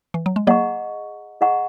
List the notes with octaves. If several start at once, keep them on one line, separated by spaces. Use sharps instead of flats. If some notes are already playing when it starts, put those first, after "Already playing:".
E3
F#3
G#3
F#3 A#3 G#4 D#5 F#5 A#5 C#6
G#4 D#5 F#5 A#5 C#6